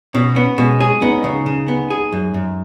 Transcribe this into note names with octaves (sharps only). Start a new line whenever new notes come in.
B2 C#4
B3 C#4
B2 G#3
C#4 G#4
B3 D#4
C#4
C#3 D#4
C#3
B3
G#4
F#2
F#2